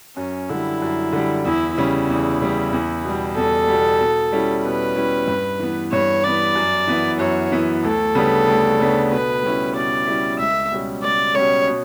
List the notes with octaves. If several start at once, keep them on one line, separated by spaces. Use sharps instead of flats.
F#2 C#4
D3 G3 E4
F#2
D3 G3
E2 E4
C#3 G3 C#4 E4
E2
C#3 G3 C#4
E2
B2 G3
E2 A4
B2 G3
B2
G3 C#4 E4
B2 B4
G3 C#4 E4
G2
E3 B3
G2 C#5
E3 B3 D5
F#2
E3 B3 E4
F#2 C#5
E3 B3 E4
D2 A4
C#3 G3 B3 D4
D2
C#3 G3 B3 D4
B2 B4
G3 C#4 E4
B2 D5
G3 C#4 E4
C#2 E5
B2 G3 C#4
C#2 D5
B2 G3 C#4 C#5
B2